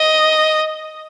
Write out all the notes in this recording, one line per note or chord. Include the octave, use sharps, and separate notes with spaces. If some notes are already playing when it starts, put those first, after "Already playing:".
Already playing: D#5